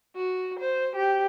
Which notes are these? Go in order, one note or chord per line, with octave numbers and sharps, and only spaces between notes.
F#4
C5
G4